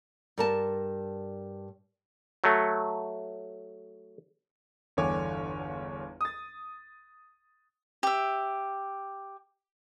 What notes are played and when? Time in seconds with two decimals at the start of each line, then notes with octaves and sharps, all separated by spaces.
0.38 G2 A#4 A5
2.44 F#3 A3
4.97 G1 E2 D3 C#5 G#5 D6
6.21 D#6 A6
8.03 G4 E5